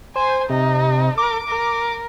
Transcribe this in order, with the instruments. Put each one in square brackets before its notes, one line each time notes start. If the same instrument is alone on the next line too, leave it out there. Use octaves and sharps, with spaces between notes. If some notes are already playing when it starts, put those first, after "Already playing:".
[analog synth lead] C5 [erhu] G#5
[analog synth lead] C3 [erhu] D#4
[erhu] A#4 [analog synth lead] D6
[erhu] A#4